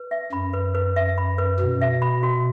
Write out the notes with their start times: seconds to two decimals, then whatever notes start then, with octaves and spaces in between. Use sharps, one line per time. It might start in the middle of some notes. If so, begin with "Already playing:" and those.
Already playing: B4
0.11 E5
0.32 F#2 B5
0.53 B4
0.75 B4
0.96 E5
1.18 B5
1.38 B4
1.59 B2 B4
1.81 E5
2.02 B5
2.23 F#4